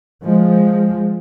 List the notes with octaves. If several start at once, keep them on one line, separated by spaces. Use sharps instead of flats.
F3 G#3